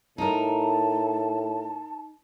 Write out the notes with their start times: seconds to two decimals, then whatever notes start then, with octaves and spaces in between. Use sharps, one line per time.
0.18 A2 D#4 A#4 A5